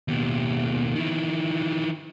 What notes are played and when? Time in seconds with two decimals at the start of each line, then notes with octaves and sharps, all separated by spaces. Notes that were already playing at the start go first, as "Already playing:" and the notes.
0.08 D#2 B2
0.96 D#3 E3